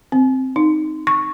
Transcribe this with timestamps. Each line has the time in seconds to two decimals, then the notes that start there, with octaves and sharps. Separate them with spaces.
0.12 C4
0.56 D#4
1.07 C#6